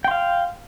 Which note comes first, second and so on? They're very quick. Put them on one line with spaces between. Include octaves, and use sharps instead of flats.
G5 C6 F5